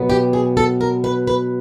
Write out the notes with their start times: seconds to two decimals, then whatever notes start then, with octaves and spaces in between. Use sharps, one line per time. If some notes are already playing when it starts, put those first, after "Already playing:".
Already playing: B2 F#3 B3
0.10 G4
0.33 G#4
0.57 A4
0.81 A#4
1.04 B4
1.27 B4